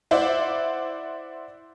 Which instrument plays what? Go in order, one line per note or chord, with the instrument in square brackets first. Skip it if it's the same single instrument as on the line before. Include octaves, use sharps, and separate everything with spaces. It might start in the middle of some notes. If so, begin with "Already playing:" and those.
[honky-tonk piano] E4 C5 D5 E5 F#5